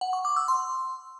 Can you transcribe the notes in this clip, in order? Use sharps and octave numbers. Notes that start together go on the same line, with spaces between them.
F#5
C#6
D6
E6
C6